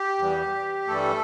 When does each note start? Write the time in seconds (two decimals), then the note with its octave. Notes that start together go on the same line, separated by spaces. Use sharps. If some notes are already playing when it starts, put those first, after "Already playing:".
Already playing: G4
0.18 E2 E3 G3
0.87 G2 E3 G3 A3 A4